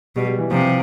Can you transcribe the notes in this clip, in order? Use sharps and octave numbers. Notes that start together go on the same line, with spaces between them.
B2 G3
G3
E3
C3 F3